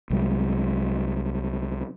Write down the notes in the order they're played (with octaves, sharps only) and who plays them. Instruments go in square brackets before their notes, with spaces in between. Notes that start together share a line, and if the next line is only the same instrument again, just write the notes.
[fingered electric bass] C2 F#3 G#3